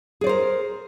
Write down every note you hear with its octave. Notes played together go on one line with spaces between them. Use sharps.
G#4 A#4 C5 D5